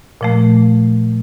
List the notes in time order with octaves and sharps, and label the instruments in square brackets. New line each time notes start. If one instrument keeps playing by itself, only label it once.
[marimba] A#2 F3 A3